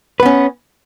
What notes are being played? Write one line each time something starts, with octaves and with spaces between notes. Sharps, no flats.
B3 C#4 B4